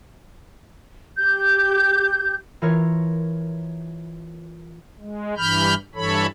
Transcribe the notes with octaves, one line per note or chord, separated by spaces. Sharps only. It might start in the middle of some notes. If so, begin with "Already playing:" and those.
G4 G6
E3 F4 A#4 C#5
G#3
G2 E3 B5 F6 G6
G2 E3 A4 C#5 B5